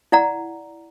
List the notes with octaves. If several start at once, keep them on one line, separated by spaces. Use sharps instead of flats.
E4 D5 F#5 A#5